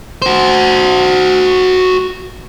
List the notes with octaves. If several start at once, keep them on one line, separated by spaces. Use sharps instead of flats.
F#4 C5